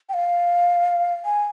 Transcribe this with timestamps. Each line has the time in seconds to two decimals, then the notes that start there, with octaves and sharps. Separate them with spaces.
0.09 G5
0.14 F5
1.25 G#5